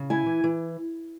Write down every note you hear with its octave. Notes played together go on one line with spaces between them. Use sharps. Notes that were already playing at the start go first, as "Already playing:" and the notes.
Already playing: C#3
E4 G#5
E3
E3